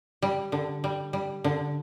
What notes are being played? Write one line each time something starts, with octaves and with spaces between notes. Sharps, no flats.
G3
D3
G3
G3
D3